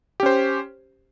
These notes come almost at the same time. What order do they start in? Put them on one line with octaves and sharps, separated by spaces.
G4 C#4 C5